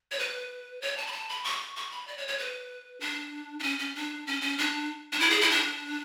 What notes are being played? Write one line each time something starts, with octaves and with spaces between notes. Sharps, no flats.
C#5
B4
C#5
A5
B5
A5
B5
C#6
C#6
B5
D5
C#5
C#5
B4
D4
D4
C#4
C#4
D4
C#4
C#4
D4
D4
E4
G#4
E4
D4